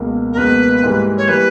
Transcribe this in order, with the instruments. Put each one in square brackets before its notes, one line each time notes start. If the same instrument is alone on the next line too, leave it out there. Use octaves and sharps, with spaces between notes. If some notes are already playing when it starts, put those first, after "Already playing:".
Already playing: [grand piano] C#2 B2 A#3
[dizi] A#4
[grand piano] C#2 B2 A#3 [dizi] B4
[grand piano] G#2 E3 G3 A#3
[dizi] C#5
[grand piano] E3 G3 A#3 [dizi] B4